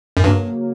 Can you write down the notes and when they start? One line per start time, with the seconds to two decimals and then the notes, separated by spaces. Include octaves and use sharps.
0.17 F#2
0.24 G2 C#3 F#3 A#3